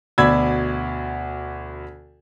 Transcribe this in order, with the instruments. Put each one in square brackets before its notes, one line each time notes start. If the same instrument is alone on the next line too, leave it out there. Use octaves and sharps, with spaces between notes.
[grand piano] D2 B2 D5 B5 E6 G#6